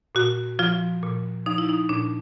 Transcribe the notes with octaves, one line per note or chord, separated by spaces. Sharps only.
A#2 F#4
F3 F4
A#2
F3 D#4
E4
D#4
A#2 D4